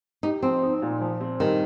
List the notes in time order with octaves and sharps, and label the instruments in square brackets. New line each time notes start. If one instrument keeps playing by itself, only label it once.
[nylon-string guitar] D#4 [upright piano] G4
[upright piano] F3 [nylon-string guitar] C4
[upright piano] D#4
A#2
F3
C4
[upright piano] G2 [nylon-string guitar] D#3